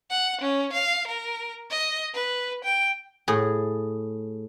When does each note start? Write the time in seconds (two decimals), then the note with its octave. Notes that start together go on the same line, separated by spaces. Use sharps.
0.10 F#5
0.41 C#4
0.72 F5
1.07 A#4
1.70 D#5
2.14 B4
2.64 G5
3.28 A2 G#4